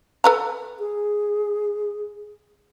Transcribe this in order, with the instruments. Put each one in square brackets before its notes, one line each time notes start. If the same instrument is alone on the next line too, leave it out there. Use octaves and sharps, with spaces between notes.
[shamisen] A4 B4 A#5
[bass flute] G#4